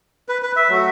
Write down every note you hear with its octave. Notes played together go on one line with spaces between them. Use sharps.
B4
B4
E5
F#3 A3 F#4